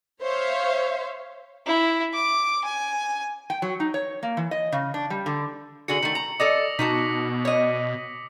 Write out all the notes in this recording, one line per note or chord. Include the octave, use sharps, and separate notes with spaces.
C5 C#5 E5 F5
E4
D6
G#5
G5
F#3
D#4
C#5
A#3
E3
D#5
C#3
D4
G3
D3
D3 F#4 G#4 C#7 F#7
D#3 A3 C#7
A#5
A4 D5 D#5 D6 D#6 A#6
B2 D#4 F#4 A5 B6
C#5 D#5